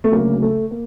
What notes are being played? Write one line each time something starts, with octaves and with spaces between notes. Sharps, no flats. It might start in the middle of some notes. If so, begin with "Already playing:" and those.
A3
D2 C#3 F#3 A#3
A3
A#3